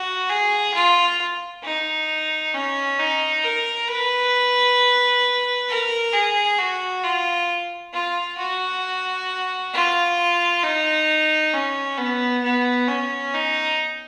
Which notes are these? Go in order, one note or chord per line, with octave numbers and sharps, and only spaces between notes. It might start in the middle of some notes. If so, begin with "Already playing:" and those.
Already playing: F#4
G#4
F4
D#4
C#4
D#4
A#4
B4
A#4
G#4
F#4
F4
F4
F#4
F4
D#4
C#4
B3
B3
C#4
D#4